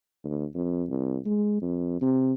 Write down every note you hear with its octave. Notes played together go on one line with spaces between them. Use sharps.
D2
F2
C2
G#3
F2
C3